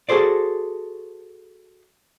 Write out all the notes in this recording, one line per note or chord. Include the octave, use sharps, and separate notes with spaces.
F#4 G#4 A4 C5 D5